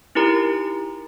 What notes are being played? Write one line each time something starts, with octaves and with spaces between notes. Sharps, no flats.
D#4 E4 G4 A#4 A#5